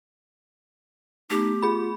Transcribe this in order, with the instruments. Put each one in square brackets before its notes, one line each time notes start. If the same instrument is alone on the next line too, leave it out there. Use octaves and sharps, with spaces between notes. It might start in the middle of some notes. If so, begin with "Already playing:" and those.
[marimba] A3 B3 [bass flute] D#4 [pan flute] G4
[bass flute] F4 [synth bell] G#4 B5